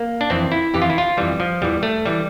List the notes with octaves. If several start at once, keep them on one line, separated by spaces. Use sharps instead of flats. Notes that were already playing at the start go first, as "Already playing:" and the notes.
Already playing: A#3
D4
F2 E3 C4
E4
F2 E3 G4
F4
E4
F4
F2 E3 G3
F3
E2 E3 G3
A3
E3 G3